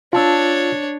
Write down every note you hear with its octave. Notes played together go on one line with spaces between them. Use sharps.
D4 F4 C#5 A5 E6